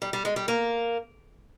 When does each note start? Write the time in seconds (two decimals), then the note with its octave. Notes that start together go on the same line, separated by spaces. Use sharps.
0.02 G3
0.13 G3
0.25 G#3
0.36 G3
0.48 A#3